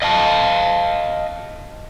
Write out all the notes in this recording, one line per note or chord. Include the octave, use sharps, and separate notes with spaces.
D#5 F5 A5